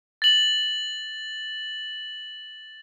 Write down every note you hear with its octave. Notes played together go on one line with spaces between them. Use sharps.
A6 F#7